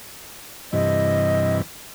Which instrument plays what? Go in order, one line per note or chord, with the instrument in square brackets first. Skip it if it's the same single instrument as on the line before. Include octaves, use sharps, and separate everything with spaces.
[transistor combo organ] G2 C3 E3 [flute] D#5